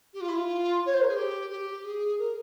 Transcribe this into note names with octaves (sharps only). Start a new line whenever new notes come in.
G4
F4
E4
F4
C#5
C5
A#4
G#4
G4
G4
G#4
A#4